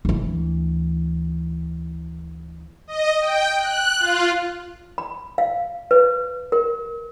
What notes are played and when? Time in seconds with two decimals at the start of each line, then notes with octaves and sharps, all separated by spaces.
0.05 D2 E3
2.87 D#5
3.21 G5
3.58 F#6
4.00 F4
4.98 B5
5.38 F5
5.91 B4
6.52 A#4